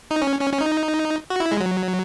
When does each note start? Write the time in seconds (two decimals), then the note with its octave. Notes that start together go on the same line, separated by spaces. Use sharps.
0.11 D#4
0.22 C#4
0.41 C#4
0.53 C#4
0.61 D#4
1.30 F#4
1.40 E4
1.52 G#3
1.60 F#3